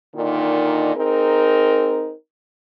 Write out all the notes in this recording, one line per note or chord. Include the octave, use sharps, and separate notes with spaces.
A#2 D3 D#3 D#4
C4 D#4 G#4 A#4